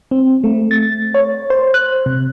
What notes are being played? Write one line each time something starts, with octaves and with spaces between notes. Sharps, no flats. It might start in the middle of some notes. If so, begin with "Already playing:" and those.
C4
A3
A6
C#5
C5
F#6
C3